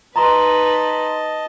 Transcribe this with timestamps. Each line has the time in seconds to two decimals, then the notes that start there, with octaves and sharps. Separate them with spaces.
0.16 D#4 B4 D#5 A5 A#5 C6